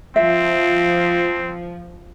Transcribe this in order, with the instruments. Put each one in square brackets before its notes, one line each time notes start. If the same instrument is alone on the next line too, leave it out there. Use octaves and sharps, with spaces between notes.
[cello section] F3 [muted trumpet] C4 [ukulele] E5